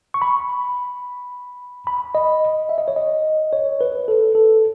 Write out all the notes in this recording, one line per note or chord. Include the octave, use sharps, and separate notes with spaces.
C#6
B5
B5
D#5
E5
D#5
C#5
D#5
C#5
B4
A4
A4